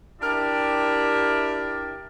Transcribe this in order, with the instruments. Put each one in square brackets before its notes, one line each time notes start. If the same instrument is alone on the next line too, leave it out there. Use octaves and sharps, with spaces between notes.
[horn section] D4 E4 G4 A#4 D5 E5